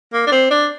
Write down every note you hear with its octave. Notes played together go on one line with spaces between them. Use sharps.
A#3
D4
C4
D4